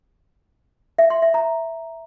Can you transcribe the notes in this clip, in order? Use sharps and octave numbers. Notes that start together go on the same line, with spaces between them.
E5
C6
E5
A#5